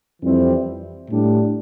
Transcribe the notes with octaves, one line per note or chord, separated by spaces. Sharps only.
F2 E3 G3 C4 E4
A2 G3 D4